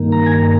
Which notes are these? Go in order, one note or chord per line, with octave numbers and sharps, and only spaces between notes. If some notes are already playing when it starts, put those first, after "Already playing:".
Already playing: G2 D#3 A#3
A#5
G#5
A#5